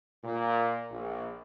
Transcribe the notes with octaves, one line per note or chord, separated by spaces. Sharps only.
A#2
A#1